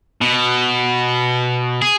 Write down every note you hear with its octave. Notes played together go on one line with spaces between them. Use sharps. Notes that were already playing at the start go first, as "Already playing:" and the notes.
B2
G#4